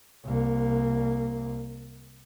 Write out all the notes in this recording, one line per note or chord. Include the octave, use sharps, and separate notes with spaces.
C2 A#3